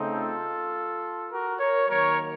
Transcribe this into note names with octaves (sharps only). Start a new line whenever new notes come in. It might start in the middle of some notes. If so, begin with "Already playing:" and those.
Already playing: C#3 A3 C4 D#4
F4 A4
F#4 A#4
A#4 C#5
D#3 F#3 A#3 A#4 C#5